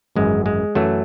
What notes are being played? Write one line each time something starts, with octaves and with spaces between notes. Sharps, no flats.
G#1 F#2 E3 G#3
G#3
F#2 E3 F#3 A3